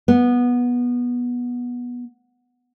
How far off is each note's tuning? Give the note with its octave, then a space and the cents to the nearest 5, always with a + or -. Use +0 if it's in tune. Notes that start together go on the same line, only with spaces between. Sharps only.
B3 -15